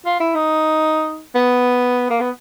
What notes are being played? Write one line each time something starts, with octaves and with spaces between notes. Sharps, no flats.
F4
E4
D#4
B3
A#3
B3